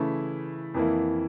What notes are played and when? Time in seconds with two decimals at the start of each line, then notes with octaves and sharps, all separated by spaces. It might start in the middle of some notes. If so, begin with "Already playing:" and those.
Already playing: C#3 E3 A3 E4
0.74 F2 E3 A#3 E4